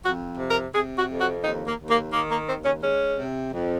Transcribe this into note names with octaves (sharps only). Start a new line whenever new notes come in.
F2 F#4
C3
A#4
C3 G#4
F#4
F2
F#4
D#2 D#4
A#3
D#2
A#3
D#3 A#3
A#3
D#2 C4
C#4
G#3 C#4
C3
F2